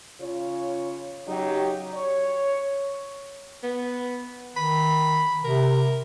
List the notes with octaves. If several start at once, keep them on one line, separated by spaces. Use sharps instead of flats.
C#3 F4 C#5
C#3 F#3 D#4 G4
C#5
B3
D#3 B5
C3 A#4